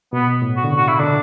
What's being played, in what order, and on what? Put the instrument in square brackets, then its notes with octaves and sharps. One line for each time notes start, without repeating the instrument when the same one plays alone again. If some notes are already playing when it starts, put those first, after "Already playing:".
[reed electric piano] B2 [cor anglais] B3
[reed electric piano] A2
[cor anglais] F#4
[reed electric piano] D3
C#3
[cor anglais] F#4
E4
[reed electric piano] D3 [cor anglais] D4